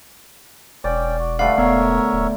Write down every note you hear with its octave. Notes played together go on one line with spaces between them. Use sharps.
E1 C#4 D5 G5
F#4
D3 G3 A3 B4 D5 F5
E1 B3 A#4 C#5 E5
D1